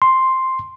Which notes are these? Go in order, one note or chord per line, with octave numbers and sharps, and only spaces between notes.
C6